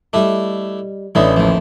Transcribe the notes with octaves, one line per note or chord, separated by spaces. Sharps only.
G3 A3 D4 E4 D#5
A1 A3 C#4 D4 E4 D#5
D#2 E3 F3 A3